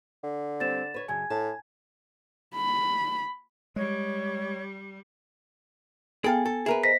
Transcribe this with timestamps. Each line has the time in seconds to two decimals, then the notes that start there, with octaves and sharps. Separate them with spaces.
0.24 D3
0.60 G3 C4 A6 E7
0.94 B4 C#5
1.08 F#2 C#3 D4 G#5 G#6
1.30 A2 A5
2.56 B5
3.76 G3 G#3 C#5
6.24 B3 G#4 A4 F5 G5 G#5
6.45 A4
6.66 G#4 A#4 B4 E5
6.84 C5 D#5 A#6 B6